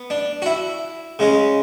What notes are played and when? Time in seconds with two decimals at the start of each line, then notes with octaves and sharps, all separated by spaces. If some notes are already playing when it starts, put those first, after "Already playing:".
Already playing: B3
0.10 D4
0.42 F#4
0.46 E4
1.19 C#3 G#3 C#4